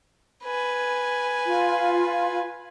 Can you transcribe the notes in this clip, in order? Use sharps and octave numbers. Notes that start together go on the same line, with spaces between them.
B4 G#5
F4